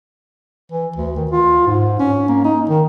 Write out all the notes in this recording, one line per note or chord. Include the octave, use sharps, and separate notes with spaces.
E3
D2
D#3
F4
G#2
C#4
A#3
D#4
D#3